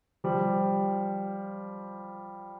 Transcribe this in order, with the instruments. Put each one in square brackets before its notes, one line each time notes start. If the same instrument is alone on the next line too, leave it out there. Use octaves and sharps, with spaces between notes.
[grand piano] F3 G3